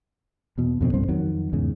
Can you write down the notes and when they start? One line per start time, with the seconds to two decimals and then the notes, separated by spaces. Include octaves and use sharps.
0.58 E2 B2
0.81 F2 B2 D3 C4
0.94 C2 G2 C4
1.09 F2 D#3 F#3
1.53 E2 G#2 C#3